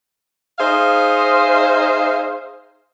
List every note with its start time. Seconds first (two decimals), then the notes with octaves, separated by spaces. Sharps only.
0.58 D#4 G#4 C5 E5 F5